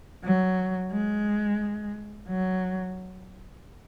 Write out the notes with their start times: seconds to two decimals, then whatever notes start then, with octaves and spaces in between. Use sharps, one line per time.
0.24 F#3
0.91 G#3
2.28 F#3